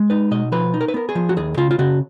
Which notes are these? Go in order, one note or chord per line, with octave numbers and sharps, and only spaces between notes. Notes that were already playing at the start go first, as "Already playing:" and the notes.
Already playing: G#3
D#4 B4
B2 D#5
F3 B4
D#4
A#4
B4
B3 A#4
G#4
F3
F#4
D#2 G#4
C#3 F4
F4
C#3 F#4